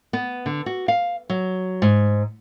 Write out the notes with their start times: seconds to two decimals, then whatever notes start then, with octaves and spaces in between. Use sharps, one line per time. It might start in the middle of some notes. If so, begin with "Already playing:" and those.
0.13 B3
0.46 D3
0.66 F#4
0.88 F5
1.30 F#3
1.82 G#2